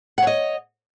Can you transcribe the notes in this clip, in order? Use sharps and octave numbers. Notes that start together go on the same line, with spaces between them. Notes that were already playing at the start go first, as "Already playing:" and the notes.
C#5 D#5 F#5